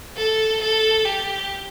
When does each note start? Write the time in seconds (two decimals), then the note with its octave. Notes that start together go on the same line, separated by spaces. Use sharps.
0.17 A4
0.61 A4
1.05 G4